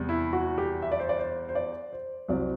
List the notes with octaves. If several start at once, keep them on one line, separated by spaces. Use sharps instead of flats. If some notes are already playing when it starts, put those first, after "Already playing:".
Already playing: E2 C3 G3
E4
F#4
G4
E5
D5
C5
D5
C5
C5
D5
C5
C2 C3 F#3 C4 D5